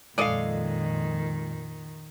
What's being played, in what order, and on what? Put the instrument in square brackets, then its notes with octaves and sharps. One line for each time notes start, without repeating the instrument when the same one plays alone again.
[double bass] F2 A#2 [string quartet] D#3 [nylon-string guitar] G#3 A4 F5 [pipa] D5 D#5